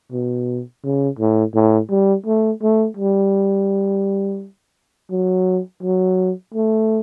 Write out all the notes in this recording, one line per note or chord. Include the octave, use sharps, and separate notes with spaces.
B2
C#3
A2
A2
G3
A3
A3
G3
F#3
F#3
A3